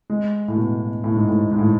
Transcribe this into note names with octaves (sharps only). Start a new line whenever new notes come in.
G#3
A2
B2
A2
G#2
A2
G#2
A2